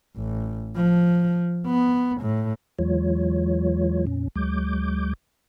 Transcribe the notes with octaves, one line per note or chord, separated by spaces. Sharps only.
A1
F3
B3
A2
E2 E3 F#3 G#3 F4 C#5
F2 A#2 C#4
D2 F#3 G#3 D6 G6